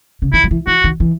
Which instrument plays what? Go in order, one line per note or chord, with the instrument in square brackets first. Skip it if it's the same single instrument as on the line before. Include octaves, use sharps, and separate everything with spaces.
[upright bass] C#3
[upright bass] D#3 [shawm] E4
[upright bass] F#3
E3
[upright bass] E3 [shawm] F#4
[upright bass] D#3
E3